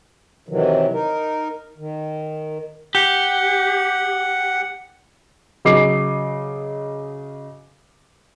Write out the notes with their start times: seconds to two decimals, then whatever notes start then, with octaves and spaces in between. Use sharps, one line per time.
0.49 C3 D#3 E3 F#3
0.93 D#4 A#4
1.78 D#3
2.95 G4 F#5
5.65 C#3 F#3 D#5 D6 C7